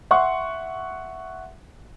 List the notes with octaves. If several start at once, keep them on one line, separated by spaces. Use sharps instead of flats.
E5 F#5 C6 C#6